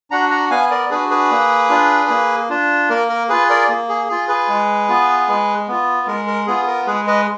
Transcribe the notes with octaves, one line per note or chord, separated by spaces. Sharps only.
D4 F#4 F#5 A#5
F#5 A#5
B3 F5 G#5
A#4 D5
D4 F#4 G#4 B4
G#4 B4
A#3
D4 F4
A#3
D4 F4
A#3 A#4
A#4
F4 G#4 B4
A#4 D5
A#3
G#4
F4 G#4
G#4 B4
G#3
B3 F4
G#3
B3 F4
G#3 A#4
A#4
B3 F4 G#4
A#4
G#3 G#4 B4
B4 D#5